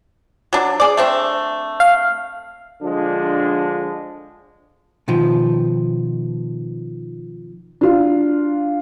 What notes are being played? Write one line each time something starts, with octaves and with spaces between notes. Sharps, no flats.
F#3 D4
G#4 D5
A3 C4 D4
F5
D3 F3 G#3 D4
B2 D#3 F3
D4 F4